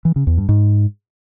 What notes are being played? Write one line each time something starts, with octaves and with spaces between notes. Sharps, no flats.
E3
C#3
E2
G2
G#2